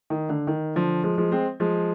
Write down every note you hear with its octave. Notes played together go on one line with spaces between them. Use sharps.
D#3
D3
D#3
D3 F3
F3 G#3
F3 G#3
G#3 C4
F3 G#3